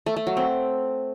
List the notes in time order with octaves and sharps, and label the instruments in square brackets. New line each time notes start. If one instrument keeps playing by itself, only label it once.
[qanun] A3
A3
F#3
C4